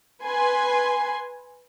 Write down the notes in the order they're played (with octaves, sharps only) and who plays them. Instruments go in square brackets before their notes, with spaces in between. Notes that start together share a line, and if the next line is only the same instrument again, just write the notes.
[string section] B4 G#5 C6